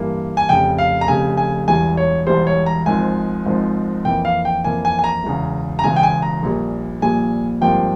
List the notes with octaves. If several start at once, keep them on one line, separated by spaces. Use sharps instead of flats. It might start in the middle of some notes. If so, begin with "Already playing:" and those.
Already playing: G2 E3 A#3
G#5
F1 F2 C#3 G5
F5
A#5
F1 F2 C#3 G#5
G#5
E1 E2 E3 G3 G#5
C#5
E1 E2 E3 G3 C5
C#5
A#5
G#1 G#2 F3 G#5
G#1 G#2 F3
F2 E3 A#3 G5
F5
G5
F2 E3 A#3 G#5
G#5
G#5
A#5
E1 E2 C#3
A#5
E1 E2 C#3 G#5
G5
G#5
A#5
A#1 A#2 G3
A#1 A#2 G3 G#5
G#1 G2 F3 A#3 G5